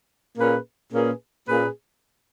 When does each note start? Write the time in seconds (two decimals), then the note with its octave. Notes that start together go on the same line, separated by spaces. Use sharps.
0.37 A#2 A#3 C#4 G#4 B4
0.91 A#2 A#3 C#4 G#4 B4
1.47 A#2 A#3 C#4 G#4 B4